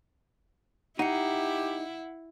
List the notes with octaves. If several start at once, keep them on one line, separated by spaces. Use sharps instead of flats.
D#4 E4 G4 F#5 C#7